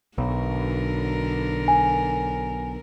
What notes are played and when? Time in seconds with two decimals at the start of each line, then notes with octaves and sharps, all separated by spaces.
0.18 B1 D3 A#4
1.68 G#5